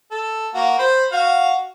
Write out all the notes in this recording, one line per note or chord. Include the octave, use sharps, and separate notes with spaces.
A4
A#3 F#4
C5 B5
F#4 F5